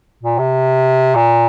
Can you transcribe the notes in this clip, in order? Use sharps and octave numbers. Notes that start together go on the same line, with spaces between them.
A#2
C3
A#2